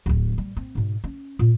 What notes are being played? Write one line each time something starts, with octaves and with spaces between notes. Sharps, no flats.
D1 D2
G3
C4
G#2 B2
C#4
A#2